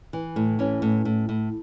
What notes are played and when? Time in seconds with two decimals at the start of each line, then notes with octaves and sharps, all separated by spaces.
0.13 E3
0.36 A2
0.59 E3 C#4
0.82 A2
1.05 A2
1.29 A2